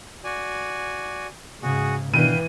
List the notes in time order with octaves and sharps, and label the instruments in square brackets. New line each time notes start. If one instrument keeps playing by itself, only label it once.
[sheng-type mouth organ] F#4 D5 G#5
[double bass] G#2 C#3 [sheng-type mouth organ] F#4 G#4
[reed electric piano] B2 D#3 D4 [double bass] E3 [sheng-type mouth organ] B4 F5 G5 [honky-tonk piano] D#7